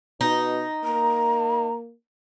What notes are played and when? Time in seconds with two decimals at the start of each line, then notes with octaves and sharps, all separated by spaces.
0.21 B2 D#4
0.84 A#3 A#5